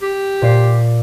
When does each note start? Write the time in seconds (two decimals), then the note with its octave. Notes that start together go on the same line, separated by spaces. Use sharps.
0.02 G4
0.42 A#2 D5 C7